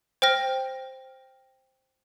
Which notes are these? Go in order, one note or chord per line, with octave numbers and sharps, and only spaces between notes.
C5 G5 F6 A#6